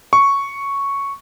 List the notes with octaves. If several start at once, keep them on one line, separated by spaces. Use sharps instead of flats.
C#6